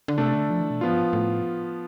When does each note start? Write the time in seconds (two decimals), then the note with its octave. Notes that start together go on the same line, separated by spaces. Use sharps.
0.08 D3
0.18 C3 A3 D4 A4
0.34 D3
0.50 F3
0.61 E3
0.70 B2
0.81 A2 F3 B3 F4
0.90 G2
1.00 A2
1.13 A2